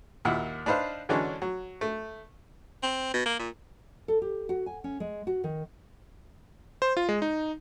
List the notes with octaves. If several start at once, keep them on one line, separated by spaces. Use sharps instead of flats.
D#2 A#2 E4 F#4
D4 D#4 B4 C5 F5
D3 E3 F#3 G#3 C#4 D4
F#3
A3
C4
B2
A#3
A#2
A4
G4
F#4
G#5
C#4
G#3
F#4
D#3
C5
F4
G#3
D#4